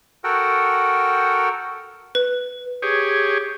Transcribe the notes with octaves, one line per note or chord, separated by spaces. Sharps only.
F#4 A4 A#4 F#5 G5
B4
G4 G#4 C#5